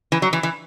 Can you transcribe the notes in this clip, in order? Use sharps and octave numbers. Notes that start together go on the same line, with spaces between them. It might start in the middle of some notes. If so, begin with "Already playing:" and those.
E3
F#3
E3
E3